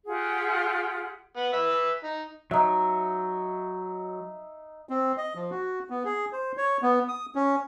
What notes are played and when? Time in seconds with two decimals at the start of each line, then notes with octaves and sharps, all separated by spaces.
0.07 F4 G4 G#4 F#5
1.37 B3 F#5
1.53 B4 E5 E6
2.03 D#4
2.51 F#3 D#4 E5
4.89 C4
5.17 D#5
5.35 F3
5.51 F#4
5.90 B3
6.05 G#4
6.33 C5
6.57 C#5
6.82 B3
7.08 D#6
7.35 C#4